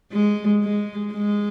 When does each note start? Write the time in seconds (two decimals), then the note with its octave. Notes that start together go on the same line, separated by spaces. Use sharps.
0.12 G#3
0.63 G#3
1.13 G#3